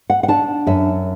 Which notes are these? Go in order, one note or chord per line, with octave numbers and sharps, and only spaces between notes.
F#5
F#5
D4 A5
F#2 E5